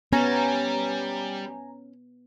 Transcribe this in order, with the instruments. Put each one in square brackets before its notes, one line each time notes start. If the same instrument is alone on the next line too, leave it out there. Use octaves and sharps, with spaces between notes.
[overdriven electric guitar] G3 [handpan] B3 [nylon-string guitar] C#4 [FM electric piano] G#5 A#5